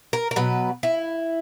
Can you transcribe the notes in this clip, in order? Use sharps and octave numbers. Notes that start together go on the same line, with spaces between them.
A#4
A#4
B2 F#3 B4
E4